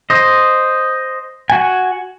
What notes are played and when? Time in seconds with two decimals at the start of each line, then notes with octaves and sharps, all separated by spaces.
0.10 C5 D#5
1.50 F#4 G#5